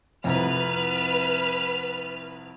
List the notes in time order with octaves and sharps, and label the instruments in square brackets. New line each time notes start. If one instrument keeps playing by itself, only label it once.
[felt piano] C2 F2 [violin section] B4 F6